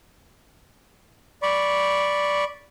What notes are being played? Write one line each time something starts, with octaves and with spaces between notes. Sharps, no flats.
D5 B5 C#6